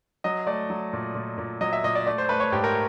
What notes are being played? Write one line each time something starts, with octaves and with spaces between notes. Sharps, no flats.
F#3 D#5
A3 D5
F#3
A#2
A#2
A#2
F#3 D#5
E5
A#2 D#5
D5
A3 D5
C5
A3 B4
C#5
G#2 G4
A#4